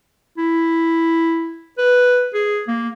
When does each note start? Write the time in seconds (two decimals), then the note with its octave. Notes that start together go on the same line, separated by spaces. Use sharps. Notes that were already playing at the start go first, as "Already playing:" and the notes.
0.38 E4
1.78 B4
2.34 G#4
2.68 A#3